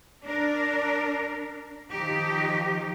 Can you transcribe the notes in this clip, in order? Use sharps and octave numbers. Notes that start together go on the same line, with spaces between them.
D4 A#4
D#3 F3 D#4 G4